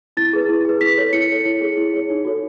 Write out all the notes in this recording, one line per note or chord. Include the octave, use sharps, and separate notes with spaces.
E4 A6
G#4 B4
E4
G#4 B4
E4 B6
A4 C#5
E4 C#7
A4 C#5
E4
G#4 C#5
E4
G#4 C#5
D#4
F#4 A4 C#5